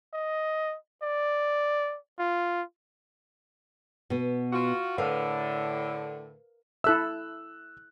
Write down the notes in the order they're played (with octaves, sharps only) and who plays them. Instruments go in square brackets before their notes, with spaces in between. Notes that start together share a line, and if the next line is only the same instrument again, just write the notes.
[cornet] D#5
D5
F4
[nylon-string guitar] B2 B3
[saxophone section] F4 F#4
[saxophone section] A2 D3 [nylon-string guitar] A#4 B4 F5
[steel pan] E4 A4 E5 [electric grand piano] E6 F#6